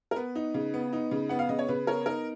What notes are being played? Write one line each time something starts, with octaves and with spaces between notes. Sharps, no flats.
A#4
B3 B4
D#4
C#3
B3
D#4
C#3
B3 F#5
F5
C#3 D#5
C#5
C#3 B4
B3 A#4 C#5
D#4 A#4